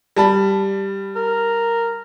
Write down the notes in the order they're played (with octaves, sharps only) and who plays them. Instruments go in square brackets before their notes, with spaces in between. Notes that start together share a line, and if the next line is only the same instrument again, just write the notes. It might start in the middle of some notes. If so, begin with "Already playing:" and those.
[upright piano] G3 A5 B5
[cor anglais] A#4